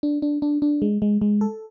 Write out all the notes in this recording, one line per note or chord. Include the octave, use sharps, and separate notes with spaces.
D4
D4
D4
D4
G#3
G#3
G#3
A4